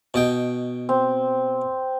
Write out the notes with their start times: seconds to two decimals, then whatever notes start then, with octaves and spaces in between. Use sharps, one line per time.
0.14 B2 D#5 G5
0.89 C4